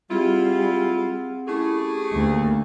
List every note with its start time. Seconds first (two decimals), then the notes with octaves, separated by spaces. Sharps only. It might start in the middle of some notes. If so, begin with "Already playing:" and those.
0.10 G3 C4 E4 F4 G#4 F#5
1.48 A3 C#4 E4 G4 G#4
2.14 D2 A#3